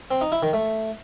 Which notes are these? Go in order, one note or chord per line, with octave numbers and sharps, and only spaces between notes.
C4
D#4
E4
D#3
A3